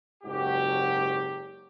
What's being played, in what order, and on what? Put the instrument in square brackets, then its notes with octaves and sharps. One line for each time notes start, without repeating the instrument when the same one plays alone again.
[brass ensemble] F#1 G#2 F#3 F#4 G4